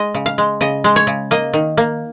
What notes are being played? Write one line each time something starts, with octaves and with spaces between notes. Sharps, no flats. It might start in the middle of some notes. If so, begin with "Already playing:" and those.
Already playing: G#3 D#5
C#3
F5
G#3
C#3 D#5
G#3
C#5
C#3
A#3 D#5
D#3
A#3